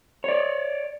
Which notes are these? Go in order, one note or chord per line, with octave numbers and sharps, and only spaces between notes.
C#5 D5